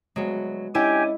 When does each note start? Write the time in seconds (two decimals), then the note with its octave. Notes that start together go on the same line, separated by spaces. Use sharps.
0.16 D2 F#3 G#3 B3
0.75 C#4 D4 E4 G4 D#5 G5 G#5